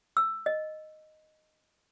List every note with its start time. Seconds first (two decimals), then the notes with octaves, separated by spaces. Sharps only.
0.17 E6
0.46 D#5